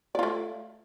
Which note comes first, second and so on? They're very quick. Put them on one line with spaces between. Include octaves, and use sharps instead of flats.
D5 F4 A3